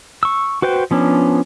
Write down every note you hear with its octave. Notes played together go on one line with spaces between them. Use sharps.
C#6 E6
F#4 B4 C5 G5
F3 B3 C#4 D4